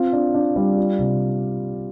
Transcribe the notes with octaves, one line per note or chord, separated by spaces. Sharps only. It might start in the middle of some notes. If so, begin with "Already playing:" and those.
Already playing: C4 F4
D4
D4
G3
F4
C3